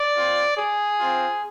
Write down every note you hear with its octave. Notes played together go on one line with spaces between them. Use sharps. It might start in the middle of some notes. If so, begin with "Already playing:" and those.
Already playing: D5
C4 F4
G#4
C4 F4